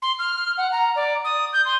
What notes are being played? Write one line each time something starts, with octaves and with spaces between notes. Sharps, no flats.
C6
F6
F#5
A#5
D5
D#6
G6
C6